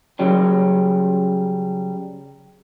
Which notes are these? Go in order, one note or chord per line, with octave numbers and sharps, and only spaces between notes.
C#3 F#3 G3